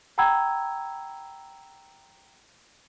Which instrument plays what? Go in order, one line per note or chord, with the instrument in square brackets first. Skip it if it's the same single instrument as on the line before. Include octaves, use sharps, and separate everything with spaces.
[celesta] F#5 G5 A#5 B5 E6 G#6